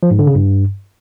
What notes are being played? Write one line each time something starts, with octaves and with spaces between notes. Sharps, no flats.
F3
G#2
D3
C#3
G2